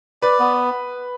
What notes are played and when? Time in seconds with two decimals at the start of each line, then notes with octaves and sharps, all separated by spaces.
0.22 B4 D5
0.40 B3